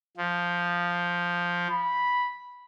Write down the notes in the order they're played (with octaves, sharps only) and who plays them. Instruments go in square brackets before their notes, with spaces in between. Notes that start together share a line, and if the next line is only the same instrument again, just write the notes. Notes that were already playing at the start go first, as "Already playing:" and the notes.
[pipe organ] F3
[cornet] B5